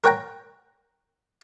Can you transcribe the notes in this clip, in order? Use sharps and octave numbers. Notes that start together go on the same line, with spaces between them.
A#4 C#5 F#5 G5 A#5